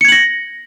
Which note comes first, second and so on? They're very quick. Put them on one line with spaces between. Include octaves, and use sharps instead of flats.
C#7 G#6 F#7 A#6